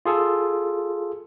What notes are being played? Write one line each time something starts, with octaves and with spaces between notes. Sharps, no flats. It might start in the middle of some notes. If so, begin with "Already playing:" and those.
F4 G#4 A4